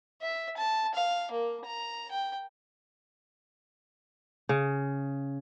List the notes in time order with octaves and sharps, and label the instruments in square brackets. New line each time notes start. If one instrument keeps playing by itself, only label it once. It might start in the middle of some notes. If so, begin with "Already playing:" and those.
[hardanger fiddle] E5
A5
F5
A#3
A#5
G5
[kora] C#3